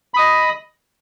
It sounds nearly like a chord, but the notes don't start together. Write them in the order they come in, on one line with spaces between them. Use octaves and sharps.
B5 D#6 D#5